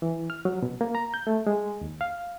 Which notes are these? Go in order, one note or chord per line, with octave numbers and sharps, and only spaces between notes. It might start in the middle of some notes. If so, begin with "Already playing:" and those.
E3
F6
F#3
B2
A#3
A#5
G6
A3
G#3
D#2
F5